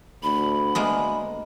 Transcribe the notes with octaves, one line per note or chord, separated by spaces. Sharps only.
D2 B5
G#3 A#3 B3